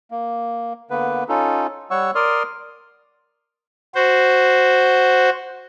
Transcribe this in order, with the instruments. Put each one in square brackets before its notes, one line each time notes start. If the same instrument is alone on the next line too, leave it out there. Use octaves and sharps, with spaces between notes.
[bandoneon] A#3
D3 A#3 B3 B4
C#4 D#4 F4 A4
G3 C#5 F#5 C#6 E6
A#4 D5 C6 D#6 F6
[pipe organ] F#4 C5